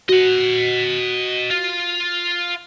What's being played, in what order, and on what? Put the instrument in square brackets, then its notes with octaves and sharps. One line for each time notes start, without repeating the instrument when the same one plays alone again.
[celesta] F#4 [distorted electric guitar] D#5 F#5
[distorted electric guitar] F4